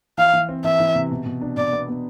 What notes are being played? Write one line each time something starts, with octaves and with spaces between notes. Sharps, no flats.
E3 F5
E3
C4
E3 E5
E3
C3
B2
B2
D4
B2 D5
B3
B3